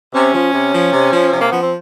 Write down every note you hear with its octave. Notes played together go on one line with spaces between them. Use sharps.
C3 C#4
F3
C3
F3
C3
F3
C3
A#3
F3 B3
C4